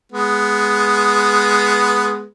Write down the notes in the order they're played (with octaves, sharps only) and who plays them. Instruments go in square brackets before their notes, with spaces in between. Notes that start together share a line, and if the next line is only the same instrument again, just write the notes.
[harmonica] G#3 B3